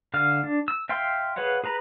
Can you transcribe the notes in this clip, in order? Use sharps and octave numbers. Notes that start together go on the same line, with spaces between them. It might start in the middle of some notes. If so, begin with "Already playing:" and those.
D3 F5 F6
D4
E6
E5 F5 G5 C6
G#4 B4 C#5 F5 F#5
G#4 B4 A#5 B5